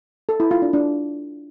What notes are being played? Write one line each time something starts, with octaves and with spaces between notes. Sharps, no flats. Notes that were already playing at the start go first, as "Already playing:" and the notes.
A4
E4
F4
D4
D4